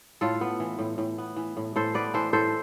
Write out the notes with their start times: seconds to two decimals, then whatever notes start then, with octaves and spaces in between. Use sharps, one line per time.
0.21 A2 F4 A4
0.41 B3
0.60 E3
0.79 A2
0.98 A2
1.18 B3
1.36 E3
1.57 A2
1.76 A2 A4 C5
1.94 B3 B4 D5
2.14 E3 A4 C5
2.33 A2 A4 C5